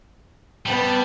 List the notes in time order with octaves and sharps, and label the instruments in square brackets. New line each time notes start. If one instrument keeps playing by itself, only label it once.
[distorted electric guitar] G3 [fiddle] B3 A5